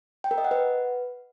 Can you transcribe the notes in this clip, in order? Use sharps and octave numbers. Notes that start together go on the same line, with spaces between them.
G5
A#4
D#5
F#5
B4